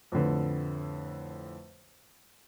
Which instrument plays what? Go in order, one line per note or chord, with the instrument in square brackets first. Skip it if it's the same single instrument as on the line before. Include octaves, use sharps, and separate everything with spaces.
[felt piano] F2 A2 D3 B4